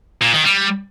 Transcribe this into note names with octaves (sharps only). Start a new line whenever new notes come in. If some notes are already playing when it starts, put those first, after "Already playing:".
A#2
D#3
G3